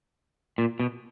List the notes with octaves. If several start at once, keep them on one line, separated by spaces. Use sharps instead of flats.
A#2
B2